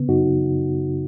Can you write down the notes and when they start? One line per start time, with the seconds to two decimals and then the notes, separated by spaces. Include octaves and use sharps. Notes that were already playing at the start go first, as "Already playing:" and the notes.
Already playing: C#3 B3
0.08 F#2 D#4 F#4